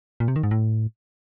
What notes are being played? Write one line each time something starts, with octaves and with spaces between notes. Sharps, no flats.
A#2
C3
D#3
G#2
A2